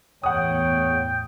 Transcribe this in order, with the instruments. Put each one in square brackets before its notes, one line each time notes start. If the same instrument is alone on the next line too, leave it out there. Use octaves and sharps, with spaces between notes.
[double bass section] E2 A2 [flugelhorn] C#5 [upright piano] F#5 D#6 [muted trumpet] G5